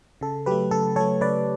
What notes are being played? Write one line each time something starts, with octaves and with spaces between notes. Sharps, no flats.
C#3 A4
F#3 A3 G4 B4
C#3 A4
F#3 A3 A4 C#5
C#3 B4 D5